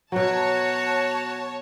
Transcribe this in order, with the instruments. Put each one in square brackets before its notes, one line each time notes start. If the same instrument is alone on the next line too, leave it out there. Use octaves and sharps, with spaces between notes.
[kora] B2 F#3 [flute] F#4 [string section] C#5 A5